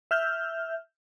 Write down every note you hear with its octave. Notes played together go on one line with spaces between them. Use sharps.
E5 F6 G6